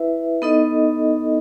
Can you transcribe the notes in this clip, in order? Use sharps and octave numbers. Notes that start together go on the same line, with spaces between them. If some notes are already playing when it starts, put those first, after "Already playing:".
Already playing: E4 B4 E5
B3 D#4 A4 D#5